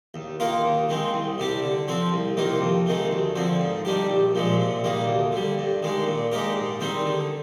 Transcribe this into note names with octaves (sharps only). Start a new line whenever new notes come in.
D#2
D#3 A#3 F4 A#4
D#2
D#3 G#3 C4
C2
C3 G3 D4 G4
D3
F3 C4 F4
C2
C3 D#3 A#3 F4
F2
C3 D#3 G#3
D2
D3 F3 C4
G#2
D#3 G3 D4 G4
A#1
A#2 F3 G#3
C3
D#3 G3 A#3
D2
D3 G3
G2
D#3 G#3 D4
A#2
G#3 D#4 G4 A#4
G#2
D#3 G3 C4 D#4
D3